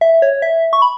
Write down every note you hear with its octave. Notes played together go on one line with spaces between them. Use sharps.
E5
C#5
E5
C#6
B5